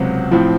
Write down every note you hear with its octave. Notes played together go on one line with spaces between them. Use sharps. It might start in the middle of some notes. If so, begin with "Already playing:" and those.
Already playing: C#2 C3 F#3 C4 F#4
A2 F3 C4